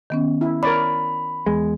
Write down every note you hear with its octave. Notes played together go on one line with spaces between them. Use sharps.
D#3 B3 C#4
E4
A#4 C#5 D5 B5
E2 G#3